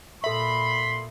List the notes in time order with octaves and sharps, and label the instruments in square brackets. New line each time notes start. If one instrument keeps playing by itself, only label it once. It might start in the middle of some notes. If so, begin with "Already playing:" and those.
[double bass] A#2 [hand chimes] A4 E5 [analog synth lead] B5 [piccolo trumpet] C6